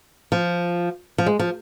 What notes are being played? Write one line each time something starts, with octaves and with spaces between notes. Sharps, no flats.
F3
F3
G#3
F3